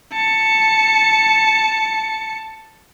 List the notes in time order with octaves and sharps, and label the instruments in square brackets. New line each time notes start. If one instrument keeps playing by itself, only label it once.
[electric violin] A5 C#7